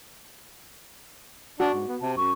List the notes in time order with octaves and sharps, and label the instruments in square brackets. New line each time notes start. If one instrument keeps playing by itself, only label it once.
[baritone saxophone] D4 [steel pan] F#4
[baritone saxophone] G#2
B3
[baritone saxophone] C3 [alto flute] A5
[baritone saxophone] F#2 [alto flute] C#6